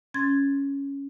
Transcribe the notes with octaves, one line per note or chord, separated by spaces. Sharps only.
C#4 C6 G#6 A6